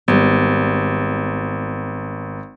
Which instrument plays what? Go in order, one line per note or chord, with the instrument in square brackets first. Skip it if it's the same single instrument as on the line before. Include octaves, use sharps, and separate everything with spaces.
[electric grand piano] G#1 [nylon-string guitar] G3 B3